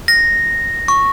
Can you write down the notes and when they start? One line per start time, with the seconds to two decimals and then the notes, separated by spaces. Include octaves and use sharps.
0.08 A#6
0.88 C#6